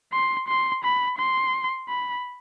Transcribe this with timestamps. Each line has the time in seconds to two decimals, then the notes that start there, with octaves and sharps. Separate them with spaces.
0.13 C6
0.48 C6
0.84 B5
1.18 C6
1.89 B5